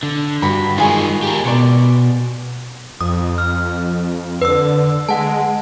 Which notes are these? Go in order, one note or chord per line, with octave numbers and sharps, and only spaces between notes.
D3
G2 F#4 B5
D#3 G#3 F4 G#4 C#6
G4 A#4
B2 D5 C6 C#6
F2 D#6
F6
D3 B4 E6
G#3 F#5 A5